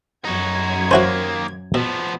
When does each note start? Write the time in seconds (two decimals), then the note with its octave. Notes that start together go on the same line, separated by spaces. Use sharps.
0.25 F#2 D#4 F#4 G#6
0.91 D#3 A#3 C#4 E4 F#4 C5 C#5 F#5
1.74 B2 F3 B3